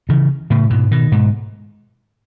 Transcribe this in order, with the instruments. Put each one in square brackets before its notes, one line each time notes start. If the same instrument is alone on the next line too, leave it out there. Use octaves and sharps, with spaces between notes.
[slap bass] C#3 E3
A2 C#3
G#2 B2
B2 D#3
G#2 B2